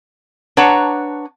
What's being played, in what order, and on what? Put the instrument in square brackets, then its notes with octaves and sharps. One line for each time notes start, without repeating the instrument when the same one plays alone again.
[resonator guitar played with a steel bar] D4 B4 C#5 F#5 A5 A#5